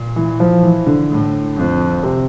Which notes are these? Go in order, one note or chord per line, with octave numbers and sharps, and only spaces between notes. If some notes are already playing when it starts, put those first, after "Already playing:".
Already playing: A#2
E3
F3
E3
D3
A2
F2
C3